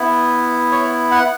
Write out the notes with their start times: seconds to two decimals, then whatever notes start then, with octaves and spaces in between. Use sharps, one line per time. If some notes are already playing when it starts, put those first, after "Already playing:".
Already playing: B3 E4
0.72 C#5
1.11 F#5